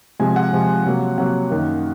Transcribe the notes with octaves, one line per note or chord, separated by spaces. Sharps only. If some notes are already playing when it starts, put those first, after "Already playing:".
C3 F3 G#3 G#5
F#5
C3 F3 G#3
C3 F#3 A#3
C3 F#3 A#3 F#5
F#2 D#3 A#3